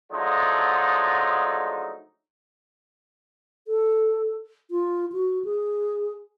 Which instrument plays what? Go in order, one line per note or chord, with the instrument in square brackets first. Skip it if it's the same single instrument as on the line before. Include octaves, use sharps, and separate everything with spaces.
[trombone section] D3 F3 F#3 G#3 A3 D#4
[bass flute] A4
F4
F#4
G#4